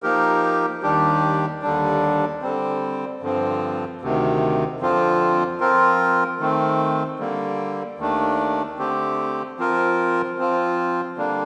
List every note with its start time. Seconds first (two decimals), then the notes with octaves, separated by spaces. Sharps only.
0.03 F3 A#3 D#4 G4 A#4
0.82 D#2 D#3 G3 D4 G4
1.62 D#2 D3 G3 D4
2.42 D3 G3 C4
3.21 G2 D3 F3 C4
4.01 D2 C3 D#3
4.80 F2 D3 F3 C4 F4
5.60 F3 C4 F4 A#4
6.39 D#3 A3 C4
7.19 D3 G3 A#3
7.98 D#2 D#3 A3 D4
8.78 D3 A3 C4 G4
9.58 F3 C4 F4 A#4
10.38 F3 C4 F4
11.18 D3 G3 A#3 D4